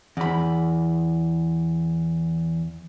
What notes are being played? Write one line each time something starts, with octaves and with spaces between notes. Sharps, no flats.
E2 B5